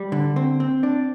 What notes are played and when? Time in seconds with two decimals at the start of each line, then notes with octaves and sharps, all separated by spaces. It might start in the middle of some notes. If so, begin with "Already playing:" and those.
Already playing: G3
0.12 D3
0.36 C4
0.60 C4
0.83 D4